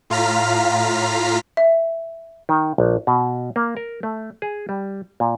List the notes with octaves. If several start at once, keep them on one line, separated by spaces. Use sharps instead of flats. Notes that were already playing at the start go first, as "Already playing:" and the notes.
A2 F4 F5 A#5 F6 B6
E5
D#3
A#1
B2
A#3
A#4
A3
G#4
G3
A#2